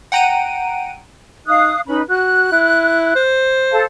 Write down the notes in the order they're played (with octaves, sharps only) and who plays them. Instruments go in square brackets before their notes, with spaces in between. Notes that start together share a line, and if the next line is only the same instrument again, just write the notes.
[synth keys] F#5 G5 A#5 D7 D#7
[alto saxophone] D#4 [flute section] F5 D#6 F#6
[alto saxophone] C#4 [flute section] D#4 B4 B5
[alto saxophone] F#4 [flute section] F#6
[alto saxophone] E4
C5
[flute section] A4 F5 A5